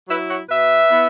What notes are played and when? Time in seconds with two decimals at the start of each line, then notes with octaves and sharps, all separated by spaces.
0.08 F#3 E4 B4 E5
0.29 C#5 F#5
0.49 B2 B4 E5
0.90 B3 E4